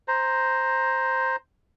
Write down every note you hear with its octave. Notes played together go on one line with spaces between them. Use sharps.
C5 A#5